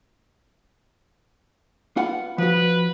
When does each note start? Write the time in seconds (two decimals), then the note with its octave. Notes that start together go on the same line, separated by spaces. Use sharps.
1.97 F4 B4 F#5
2.38 F3 F#4 B4